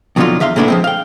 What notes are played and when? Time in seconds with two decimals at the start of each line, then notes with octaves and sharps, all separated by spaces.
0.16 F2 B2 D3 F#3 D#4 F4
0.40 E2 E5 F5 C6
0.56 A#2 G#3 A3 B3 D4 E4
0.68 F3 G#3 C4
0.84 F5 G5